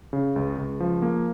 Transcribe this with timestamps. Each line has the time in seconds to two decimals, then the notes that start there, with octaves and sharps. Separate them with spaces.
0.13 C#3
0.36 C#2
0.58 C#2
0.80 F3
1.02 A#3